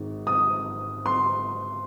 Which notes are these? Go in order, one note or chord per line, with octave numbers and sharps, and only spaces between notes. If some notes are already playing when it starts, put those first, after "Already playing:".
Already playing: G#1 G#2 D#3
D#6
C6